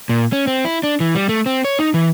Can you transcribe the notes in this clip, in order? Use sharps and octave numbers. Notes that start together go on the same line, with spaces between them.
A#2
C#4
C4
E4
D4
E3
G3
A3
C4
C#5
D#4
E3